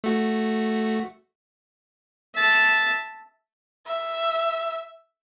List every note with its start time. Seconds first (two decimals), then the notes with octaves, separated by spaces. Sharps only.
0.04 A3 F#4
2.35 E5 A5
3.87 E5